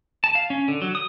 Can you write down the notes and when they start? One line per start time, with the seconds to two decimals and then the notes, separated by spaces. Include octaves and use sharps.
0.24 A5
0.35 F5
0.50 C#4
0.68 D3
0.82 F#3
0.95 D#6